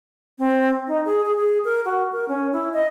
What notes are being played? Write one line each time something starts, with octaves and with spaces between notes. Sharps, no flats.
C4
D#4
G#4
G#4
G#4
A#4
F#4
A#4
C#4
E4
D#5